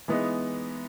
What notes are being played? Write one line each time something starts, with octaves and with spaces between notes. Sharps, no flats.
E3 G#3 B3 D#4